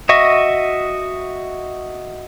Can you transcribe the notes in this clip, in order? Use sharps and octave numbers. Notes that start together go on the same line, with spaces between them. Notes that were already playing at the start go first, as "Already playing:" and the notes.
F#4 D#5 E5 C#6